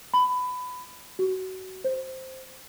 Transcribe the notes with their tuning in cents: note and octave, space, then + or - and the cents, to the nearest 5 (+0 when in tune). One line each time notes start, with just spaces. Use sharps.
B5 +20
F#4 +25
C5 +0